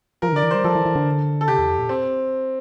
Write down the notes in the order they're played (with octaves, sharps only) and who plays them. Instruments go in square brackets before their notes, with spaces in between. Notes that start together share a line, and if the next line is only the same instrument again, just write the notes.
[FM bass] F3 [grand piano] A#4
[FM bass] E3
[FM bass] D3 [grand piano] D5
[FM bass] E3
[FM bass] G3 [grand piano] C5
[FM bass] F3 [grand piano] A4
[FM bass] E3
E3
D3
[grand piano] A4
[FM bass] C3 [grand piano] G4
[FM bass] E2
F2
A#2
[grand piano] C4